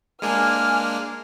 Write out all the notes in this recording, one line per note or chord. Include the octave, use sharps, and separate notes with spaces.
G#3 A#3 D4 G#5 F6 G#6